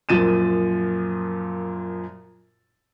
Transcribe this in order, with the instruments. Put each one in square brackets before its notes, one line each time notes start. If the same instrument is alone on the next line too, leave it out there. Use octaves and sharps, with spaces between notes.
[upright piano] F#2 A#2 F3 A6 D#7 E7